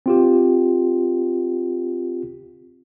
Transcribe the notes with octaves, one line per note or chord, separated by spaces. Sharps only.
C4 F4 G4